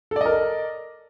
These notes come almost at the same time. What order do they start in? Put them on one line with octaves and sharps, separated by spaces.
A4 D5 D#5 A#4